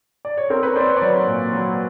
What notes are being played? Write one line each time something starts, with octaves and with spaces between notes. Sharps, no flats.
D5
C#5
C4 A#4 C5
B4 C#5
C4 C5 D5
B4 C#5
D5
F#3 B4 C#5
A#2
F#3